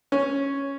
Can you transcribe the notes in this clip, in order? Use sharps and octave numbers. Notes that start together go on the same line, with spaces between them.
C#4